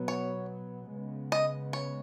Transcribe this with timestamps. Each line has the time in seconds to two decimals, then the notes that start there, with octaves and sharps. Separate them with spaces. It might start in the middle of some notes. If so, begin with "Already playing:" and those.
Already playing: B2 F#3 B3
0.08 C#5
0.91 C#3 G#3 B3
1.32 D#5
1.73 C#5